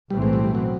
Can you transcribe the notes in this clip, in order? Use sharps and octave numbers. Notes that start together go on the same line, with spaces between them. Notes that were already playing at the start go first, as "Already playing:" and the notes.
B1 A2 E3 G3 A3 C4
G#3
G3
G3
F#3